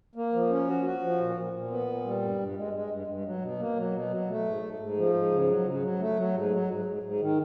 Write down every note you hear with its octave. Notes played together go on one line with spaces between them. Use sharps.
A#3
F3
C#4
F#4
F#4
F3
A#2
A#2
A#2
B3
A#2
G3
G2
G2
G#3
G#3
G2
G2
F#3
B2
A#3
F#3
B2
F#3
A3
G#2
G#2
G#2
F3
G#2
C#3
F#3
C#3
F#3
A3
F#3
G#2
F#3
G#2
G#2
G#2
D#3